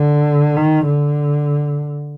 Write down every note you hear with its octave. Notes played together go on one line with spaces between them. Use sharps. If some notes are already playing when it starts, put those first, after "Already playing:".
Already playing: D3
D#3
D3